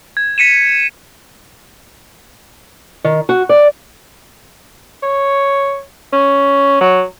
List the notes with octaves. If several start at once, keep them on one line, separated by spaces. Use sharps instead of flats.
G#6
B6 C#7 D#7 E7
D#3
F#4
D5
C#5
C#4
F#3